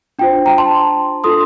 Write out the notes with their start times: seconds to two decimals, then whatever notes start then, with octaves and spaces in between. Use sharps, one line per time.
0.19 D4 F4 C5 G5
0.46 G5 A#5
0.58 A5 C6
1.24 D4 F4 A4 C6 D#6